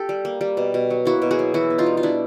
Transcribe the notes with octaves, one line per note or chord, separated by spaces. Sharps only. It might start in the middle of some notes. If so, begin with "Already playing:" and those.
Already playing: G4 A4
G3
A#3
G3
B2
B2
F#3
A#3 E4 F#4
B2
F#4 G#4
F#3
E3 E4 F#4
B3
D#4 F4
G3
F4
G3 D4 E4